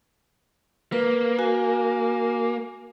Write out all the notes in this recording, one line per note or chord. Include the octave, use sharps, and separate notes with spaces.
A#3 B4
F#4 G#5